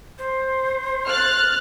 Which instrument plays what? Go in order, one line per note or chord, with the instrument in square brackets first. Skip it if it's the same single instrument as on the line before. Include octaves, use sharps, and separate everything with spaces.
[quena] C5
[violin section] F6 F#6 A6